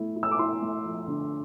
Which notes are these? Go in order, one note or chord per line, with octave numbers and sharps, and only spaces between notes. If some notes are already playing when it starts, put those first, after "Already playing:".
Already playing: A3 E4
E4
E6
D6
E4 C6
A3
F3
D3